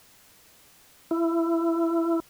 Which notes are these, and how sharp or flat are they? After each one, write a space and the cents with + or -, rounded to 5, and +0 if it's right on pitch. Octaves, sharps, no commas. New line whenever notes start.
E4 +20